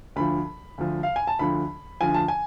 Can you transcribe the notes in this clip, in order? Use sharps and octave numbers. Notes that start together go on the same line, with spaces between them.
D2 D3 F3 B5
D2 D3 F3
F5
G#5
A5
D2 D3 F3 B5
D2 D3 F3 G#5
A5
G#5